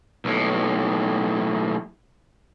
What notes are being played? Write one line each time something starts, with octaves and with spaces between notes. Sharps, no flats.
B1 A2